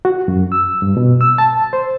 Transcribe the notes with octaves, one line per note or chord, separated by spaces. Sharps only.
F#4
F#2
E6
G2
B2
E6
A5
C5